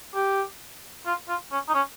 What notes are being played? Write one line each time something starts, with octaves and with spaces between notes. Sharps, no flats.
G4
F4
F4
C#4
D#4
C#4